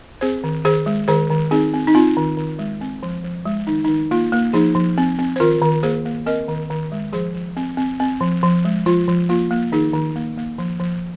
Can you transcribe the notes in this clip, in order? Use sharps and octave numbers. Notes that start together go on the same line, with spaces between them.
C4 G#4 C5
D#3
D#3 G#4 C5
G#3
D#3 G#4 C5
D#3
C4 D#4 G#4
C4
D#4
C4 F4
D#3
D#3
G#3
C4
F3
F3
G#3
D#3 D#4
D#3 D#4
A#3 F4
A#3
F3 D#4 G#4
F3
C4
C4
C5
D#3 F4 A#4
D#3
A#3 G#4 C5
A#3
C4 A#4 D#5
D#3
D#3
G#3
F3 G#4 C5
F3
C4
C4
C4
F3
F3
G#3
F3 F4
F3
A#3 F4
A#3
D#3 D#4 G#4
D#3
A#3
A#3
F3
F3